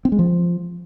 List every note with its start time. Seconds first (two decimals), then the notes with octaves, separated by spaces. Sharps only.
0.05 C4
0.12 G#3
0.19 F3